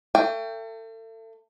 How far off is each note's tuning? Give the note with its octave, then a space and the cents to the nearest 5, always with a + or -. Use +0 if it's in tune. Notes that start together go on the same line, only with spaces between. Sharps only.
A3 +35 G5 +0